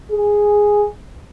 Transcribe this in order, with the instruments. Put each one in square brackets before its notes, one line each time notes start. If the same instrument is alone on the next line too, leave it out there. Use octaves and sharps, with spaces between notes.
[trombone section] G#4